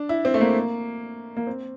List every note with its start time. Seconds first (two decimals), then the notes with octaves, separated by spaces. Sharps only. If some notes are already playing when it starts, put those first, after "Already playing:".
Already playing: D4
0.09 E4
0.25 C4
0.34 A3
0.41 A#3
1.37 A#3
1.47 C4